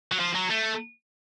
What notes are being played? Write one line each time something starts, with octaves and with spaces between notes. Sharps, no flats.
F#3
F3
F#3
A3